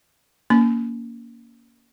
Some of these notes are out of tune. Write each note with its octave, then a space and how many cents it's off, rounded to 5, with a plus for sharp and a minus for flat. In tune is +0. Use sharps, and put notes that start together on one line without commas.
A#3 +0 C#4 +25 B5 +40